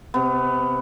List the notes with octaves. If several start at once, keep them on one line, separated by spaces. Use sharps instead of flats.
C3 B3